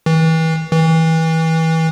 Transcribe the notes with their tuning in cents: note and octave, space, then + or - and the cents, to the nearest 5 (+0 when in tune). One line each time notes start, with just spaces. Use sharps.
E3 -35
E3 -30